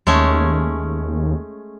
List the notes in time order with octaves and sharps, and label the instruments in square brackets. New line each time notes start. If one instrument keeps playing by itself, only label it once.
[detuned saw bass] D#2 [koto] G#3 A3 C#4